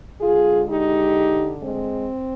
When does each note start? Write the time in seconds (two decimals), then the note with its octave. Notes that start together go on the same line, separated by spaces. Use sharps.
0.21 D3 G#3 F4 G#4
0.68 D#4 G4
1.63 G#3 C4